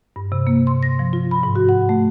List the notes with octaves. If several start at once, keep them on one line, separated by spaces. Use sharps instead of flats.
G2
C3
A#3
C6
A#6
F3
F4
B5
G#2
F#4
F#5
A3